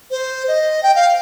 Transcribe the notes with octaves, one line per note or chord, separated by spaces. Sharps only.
C5
D#5
G5
F5